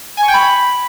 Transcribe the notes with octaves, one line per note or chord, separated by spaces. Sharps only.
G#5
C#6
G5
B5